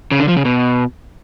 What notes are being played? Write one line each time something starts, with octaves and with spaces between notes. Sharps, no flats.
C#3
D3
F3
C#3
B2